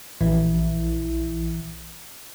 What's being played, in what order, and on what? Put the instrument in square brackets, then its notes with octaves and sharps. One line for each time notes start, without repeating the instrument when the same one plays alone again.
[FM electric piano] A#1 E3 E4